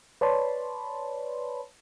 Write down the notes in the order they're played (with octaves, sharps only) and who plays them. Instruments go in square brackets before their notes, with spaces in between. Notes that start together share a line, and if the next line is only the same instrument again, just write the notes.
[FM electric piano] B4 C#5 D5 A5 B5 C6